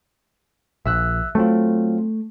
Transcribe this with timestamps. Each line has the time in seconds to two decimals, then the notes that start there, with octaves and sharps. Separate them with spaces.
0.86 A#1 E5 E6 F#6
1.35 F#3 A3 C4 F4